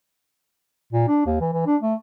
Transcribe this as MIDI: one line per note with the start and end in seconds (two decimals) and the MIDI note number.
0.93 1.08 46
1.08 1.22 62
1.26 1.36 39
1.40 1.49 52
1.53 1.64 52
1.66 1.76 62
1.82 1.94 57